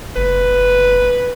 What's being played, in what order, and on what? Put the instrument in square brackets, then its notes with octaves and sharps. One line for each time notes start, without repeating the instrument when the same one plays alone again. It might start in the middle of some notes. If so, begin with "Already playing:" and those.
[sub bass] F#1 [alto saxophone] B4